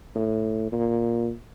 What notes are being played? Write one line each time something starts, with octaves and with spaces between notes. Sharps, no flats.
A2
A#2